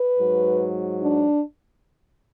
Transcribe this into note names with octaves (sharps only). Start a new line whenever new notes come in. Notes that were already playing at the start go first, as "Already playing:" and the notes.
Already playing: B4
G#2 F#3
D4